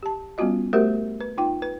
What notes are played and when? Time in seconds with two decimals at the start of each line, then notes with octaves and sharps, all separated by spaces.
0.03 G4 A5
0.38 G3 B3 C#4 F4 F#4 D#5
0.73 A3 F#4 G4 A#4 C5 E5
1.21 B4
1.38 D#4 F4 G5
1.62 B4